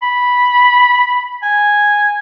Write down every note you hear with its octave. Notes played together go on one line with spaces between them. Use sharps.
B5
G#5